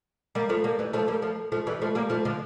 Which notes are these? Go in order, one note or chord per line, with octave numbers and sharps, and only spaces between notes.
G3 A#3
F3 A3
G3 A#3
E3 G3
F3 A3
G3 A#3
F3 A3
F3 A3
E3 G3
F3 A3
G3 A#3
F3 A3
D3 F3